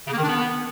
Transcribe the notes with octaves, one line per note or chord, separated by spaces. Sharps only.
C#3
A#3
D#3
D4
B3